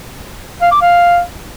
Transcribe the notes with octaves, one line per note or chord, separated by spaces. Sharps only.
F5
D6
F5